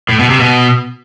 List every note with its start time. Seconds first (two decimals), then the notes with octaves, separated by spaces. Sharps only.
0.09 A2
0.19 B2
0.30 C3
0.40 B2